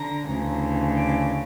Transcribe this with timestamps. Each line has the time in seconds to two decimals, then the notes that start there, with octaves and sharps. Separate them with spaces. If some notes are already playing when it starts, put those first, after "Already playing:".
Already playing: D3 A#5
0.25 D2 C#3 E3
0.96 D6